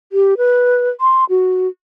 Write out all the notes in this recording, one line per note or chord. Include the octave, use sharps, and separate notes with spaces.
G4
B4
C6
F#4